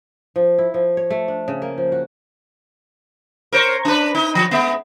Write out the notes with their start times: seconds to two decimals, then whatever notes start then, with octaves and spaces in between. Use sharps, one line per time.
0.36 F3
0.58 E4
0.74 F3
0.97 C#5
1.10 A3
1.28 D4
1.48 C#3
1.62 A#3
1.78 F3
1.92 F#4
3.52 A#4 C5 C#5
3.85 D4 B4
4.15 D#4
4.35 F3
4.51 G#3 B3